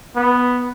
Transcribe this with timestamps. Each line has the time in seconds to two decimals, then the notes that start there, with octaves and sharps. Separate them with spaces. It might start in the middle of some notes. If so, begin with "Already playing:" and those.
0.16 B3